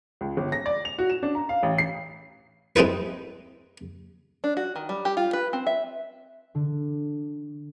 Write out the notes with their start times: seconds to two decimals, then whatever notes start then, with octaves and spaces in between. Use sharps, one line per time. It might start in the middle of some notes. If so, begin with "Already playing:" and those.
0.21 C#2
0.37 G1
0.52 A#6
0.66 D5
0.85 F7
0.99 F#4
1.10 E7
1.23 D4
1.35 A#5
1.49 F5
1.63 A1
1.78 C7
2.76 G#3 C4 D#4 E4 B4
4.44 D4
4.57 F#4
4.76 D#3
4.89 G3
5.05 G4
5.17 F4
5.33 B4
5.53 C4
5.67 E5
6.55 D3